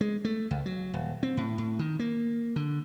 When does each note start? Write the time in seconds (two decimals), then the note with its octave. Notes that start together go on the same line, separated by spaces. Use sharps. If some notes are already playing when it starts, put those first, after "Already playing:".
0.01 G#3
0.25 A3
0.51 C#2
0.66 F#3
0.94 D#1
1.23 C4
1.37 A2
1.58 A2
1.79 D#3
1.99 A#3
2.56 D3